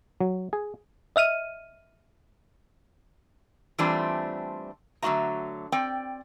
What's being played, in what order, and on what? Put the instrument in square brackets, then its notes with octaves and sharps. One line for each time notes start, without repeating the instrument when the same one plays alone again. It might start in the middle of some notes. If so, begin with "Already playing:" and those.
[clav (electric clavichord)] F#3
G#4
[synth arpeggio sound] D#5 E5 F6 D#7
[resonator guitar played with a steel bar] E3 G3 A3 C4 D4 F4
D3 F#3 A3 F#4 E5 A#5
C4 D5 G5